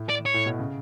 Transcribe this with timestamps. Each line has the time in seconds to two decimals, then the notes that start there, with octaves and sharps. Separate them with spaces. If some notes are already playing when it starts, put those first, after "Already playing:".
Already playing: A2
0.09 D5
0.26 C#5
0.34 A2
0.46 B2
0.59 C#3